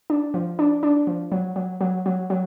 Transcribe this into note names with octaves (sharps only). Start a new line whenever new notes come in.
D4
F3
D4
D4
F3
F#3
F#3
F#3
F#3
F#3